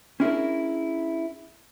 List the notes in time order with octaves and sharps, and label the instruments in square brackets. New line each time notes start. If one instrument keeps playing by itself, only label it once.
[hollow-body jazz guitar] C#4 D4 E4 G#4 A#4